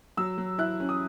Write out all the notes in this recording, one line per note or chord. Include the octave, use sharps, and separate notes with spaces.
F#3 E6
F#3
E4 F#6
C#4
D#6